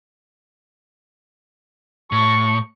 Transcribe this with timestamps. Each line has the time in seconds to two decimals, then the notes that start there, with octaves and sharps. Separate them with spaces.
2.12 A2 C#6